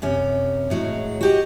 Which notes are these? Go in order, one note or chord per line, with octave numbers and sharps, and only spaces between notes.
F#2 C3 C#4
A2 F#3 G#3
F#4 G4 D#5